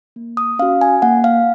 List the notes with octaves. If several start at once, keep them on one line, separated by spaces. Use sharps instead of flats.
A#3
D#6
C#4 F#4 F5
G#5
A#3 F#5
F5